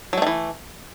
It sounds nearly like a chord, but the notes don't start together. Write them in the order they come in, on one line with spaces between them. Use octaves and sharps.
F#3 A3 D#3 E3